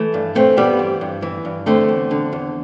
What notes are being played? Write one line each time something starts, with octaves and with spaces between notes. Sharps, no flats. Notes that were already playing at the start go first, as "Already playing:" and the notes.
Already playing: E3 A3
G2
E3 A3 C4
G2 G3 B3
E3
G2
E3
G2
D3 A3 C4
E2
D3
E2